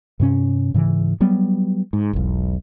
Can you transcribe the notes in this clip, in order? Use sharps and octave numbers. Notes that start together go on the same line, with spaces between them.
G2 C3 C#4
G#2 C#3 E3
F#3 G3 B3
G#2
E1 B1